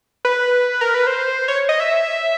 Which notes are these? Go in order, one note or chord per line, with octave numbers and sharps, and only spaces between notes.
B4
A#4
B4
C5
C#5
D#5
E5